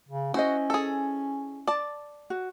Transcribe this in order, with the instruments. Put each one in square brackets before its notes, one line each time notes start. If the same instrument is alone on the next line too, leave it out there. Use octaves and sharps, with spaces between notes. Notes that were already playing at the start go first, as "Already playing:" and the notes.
[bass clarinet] C#3
[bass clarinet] C#4 [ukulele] E4 C5 D#5 [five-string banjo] F#4
[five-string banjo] G#4 A4
D5 A5
[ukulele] F#4